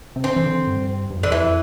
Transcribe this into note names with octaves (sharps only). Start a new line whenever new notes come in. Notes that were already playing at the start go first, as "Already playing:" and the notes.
C3
D3 C4
E3
D3
G2
G2
F2
E2 D3
F2 E3